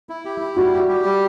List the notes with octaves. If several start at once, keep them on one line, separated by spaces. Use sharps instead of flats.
E4
G4
E4
G3 F#4
G4
G4
G3